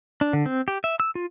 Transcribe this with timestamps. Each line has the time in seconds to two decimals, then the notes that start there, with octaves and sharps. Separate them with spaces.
0.21 D4
0.33 D3
0.46 C4
0.68 G4
0.84 E5
1.00 E6
1.15 F4